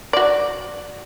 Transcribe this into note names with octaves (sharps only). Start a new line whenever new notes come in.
F#4 D5